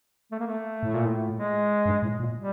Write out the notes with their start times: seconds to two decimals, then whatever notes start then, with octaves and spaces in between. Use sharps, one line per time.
0.32 A3
0.39 A#3
0.47 A3
0.83 A2
0.94 A#2
1.05 A2
1.35 G#3
1.86 G2
2.03 A2
2.20 A#2
2.37 G3